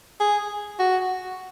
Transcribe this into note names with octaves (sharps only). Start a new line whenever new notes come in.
G#4
F#4